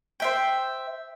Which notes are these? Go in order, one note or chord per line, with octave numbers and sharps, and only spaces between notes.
C5 E5 G5